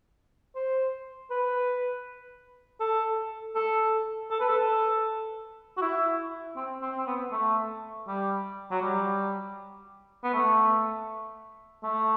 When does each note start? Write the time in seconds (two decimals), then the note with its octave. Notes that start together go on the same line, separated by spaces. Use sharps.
0.55 C5
1.30 B4
2.81 A4
3.56 A4
4.31 A4
4.40 B4
4.49 A4
5.77 F#4
5.82 E4
6.56 C4
6.82 C4
6.98 C4
7.07 B3
7.32 A3
8.08 G3
8.71 F#3
8.82 G3
10.24 B3
10.33 A3
11.83 A3